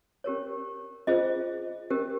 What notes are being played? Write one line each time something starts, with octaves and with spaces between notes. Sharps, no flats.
C#4 G4 A#4 C#5
C#4 F4 G#4 C5 D#5
C#4 G4 A#4